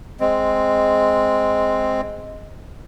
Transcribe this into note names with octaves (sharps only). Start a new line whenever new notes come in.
G#3 C4